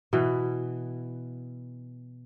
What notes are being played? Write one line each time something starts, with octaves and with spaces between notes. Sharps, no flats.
B2 E3